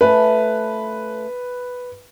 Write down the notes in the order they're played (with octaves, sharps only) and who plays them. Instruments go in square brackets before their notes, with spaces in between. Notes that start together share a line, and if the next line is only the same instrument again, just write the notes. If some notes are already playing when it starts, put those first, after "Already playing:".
[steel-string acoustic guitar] A3 C#4 F4 [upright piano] B4